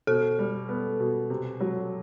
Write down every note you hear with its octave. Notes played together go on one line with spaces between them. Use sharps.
B2 A4
G3
B3
B2
C3
F#3